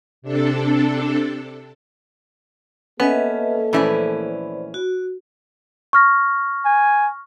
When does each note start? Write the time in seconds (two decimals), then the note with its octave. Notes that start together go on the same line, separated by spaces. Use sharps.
0.22 C3 D4 A4
3.00 A#3 B3 C#4 A4 B4 D#5 E5
3.73 A#1 E3 A3 C#4 E4 B4 C5 D5
4.74 F#4
5.93 C#6 F6 A#6
6.65 G#5